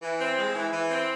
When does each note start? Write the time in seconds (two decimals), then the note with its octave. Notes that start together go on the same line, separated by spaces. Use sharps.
0.01 E3
0.19 C4
0.37 G#3
0.55 E3
0.72 E3
0.91 C4